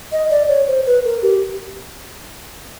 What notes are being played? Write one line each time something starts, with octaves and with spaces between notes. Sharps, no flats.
D#5
D5
C#5
C5
B4
A#4
G4